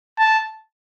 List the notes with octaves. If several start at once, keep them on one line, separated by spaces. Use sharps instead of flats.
A5